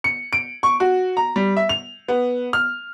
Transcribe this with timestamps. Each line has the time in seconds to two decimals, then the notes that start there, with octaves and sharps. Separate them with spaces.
0.04 C#7
0.33 D7
0.63 C#6
0.80 F#4
1.17 A#5
1.36 G3
1.57 E5
1.69 F7
2.08 B3
2.53 F6